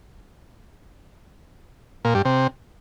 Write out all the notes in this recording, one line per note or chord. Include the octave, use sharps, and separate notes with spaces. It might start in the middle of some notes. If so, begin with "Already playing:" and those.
A#2
G2
C3